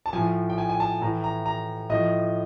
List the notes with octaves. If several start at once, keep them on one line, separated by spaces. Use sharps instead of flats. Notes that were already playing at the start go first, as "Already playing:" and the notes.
A5
A2 F3 G#5
G5
G#5
G#5
A5
A2 E3 A#5
A#5
A#5
A2 F3 D#5